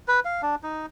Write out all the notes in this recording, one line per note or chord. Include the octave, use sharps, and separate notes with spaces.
B4
F5
D4
D#4